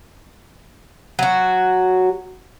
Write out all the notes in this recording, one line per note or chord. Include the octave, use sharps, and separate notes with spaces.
F#3 F#4